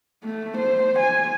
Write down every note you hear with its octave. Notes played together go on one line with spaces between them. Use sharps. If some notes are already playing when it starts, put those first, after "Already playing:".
A3
C5
G#5